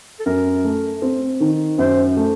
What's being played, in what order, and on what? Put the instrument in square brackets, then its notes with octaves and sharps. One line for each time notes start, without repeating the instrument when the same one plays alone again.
[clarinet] A4
[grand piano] F#2 [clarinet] A#4
[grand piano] A3
C4
D#3
[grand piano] F#2 [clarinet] C5
[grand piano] A3